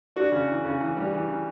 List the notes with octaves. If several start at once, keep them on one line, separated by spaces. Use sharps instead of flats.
D4 F#4
C#3
E3
C#3
E3
G3
E3
E3